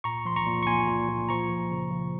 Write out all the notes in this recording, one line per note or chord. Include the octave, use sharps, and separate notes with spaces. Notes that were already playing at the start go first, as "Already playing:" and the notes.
A#2 A#5 C#6
F3 C6
A#5 C#6
A#2
C#6
A#2 G#5 C6
A#2
A#2
F3 A#5 C#6
F3
C#3
F3